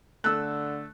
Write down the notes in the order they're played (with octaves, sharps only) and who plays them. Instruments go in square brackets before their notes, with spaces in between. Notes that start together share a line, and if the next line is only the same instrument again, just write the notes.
[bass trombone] D3 [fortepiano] A3 E6 [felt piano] F#6